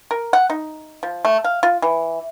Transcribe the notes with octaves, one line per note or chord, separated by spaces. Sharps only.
A#4
F#5
D#4
F3
A3
F5
F4
E3